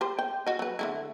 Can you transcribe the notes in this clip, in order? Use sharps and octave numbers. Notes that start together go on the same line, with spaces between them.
G4 C5
G5
F#4 D#5
F#3 B4
D3 A3 E4